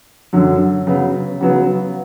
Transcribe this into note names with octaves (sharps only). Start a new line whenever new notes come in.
F#2 D3 F#3
C#3 F#3 B3
C#3 F#3 B3